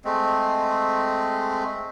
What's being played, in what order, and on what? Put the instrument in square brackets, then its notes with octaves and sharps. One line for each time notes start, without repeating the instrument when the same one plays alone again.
[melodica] G#3 A3 C4